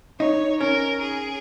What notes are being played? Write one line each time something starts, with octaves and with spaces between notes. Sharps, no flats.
D#4 C#5
C#4 A#4
G#4